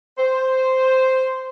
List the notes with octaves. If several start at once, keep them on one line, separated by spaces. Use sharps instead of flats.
C5